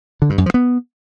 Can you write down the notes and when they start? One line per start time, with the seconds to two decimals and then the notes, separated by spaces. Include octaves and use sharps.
0.22 D3
0.30 G2
0.38 F#2
0.46 F3
0.54 B3